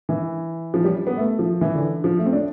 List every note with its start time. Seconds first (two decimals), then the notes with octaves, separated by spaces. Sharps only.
0.09 E3
0.74 F3
0.84 G3
1.07 B3
1.17 A3
1.39 F3
1.61 E3
1.75 D3
2.04 F3
2.19 A3
2.26 C4
2.33 D4